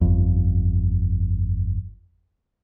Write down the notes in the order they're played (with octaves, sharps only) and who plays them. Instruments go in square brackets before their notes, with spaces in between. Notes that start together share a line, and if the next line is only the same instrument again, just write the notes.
[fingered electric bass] G1 F2